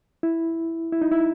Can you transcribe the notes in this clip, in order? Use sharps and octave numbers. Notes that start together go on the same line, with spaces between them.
E4
E4
D#4
E4